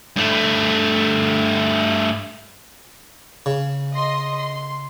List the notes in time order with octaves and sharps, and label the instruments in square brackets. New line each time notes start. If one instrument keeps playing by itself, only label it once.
[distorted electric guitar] G2 A3
[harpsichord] C#3
[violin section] D#5 C6
C6